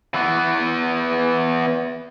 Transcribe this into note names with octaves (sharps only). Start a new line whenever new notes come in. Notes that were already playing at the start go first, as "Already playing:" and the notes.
E3 B3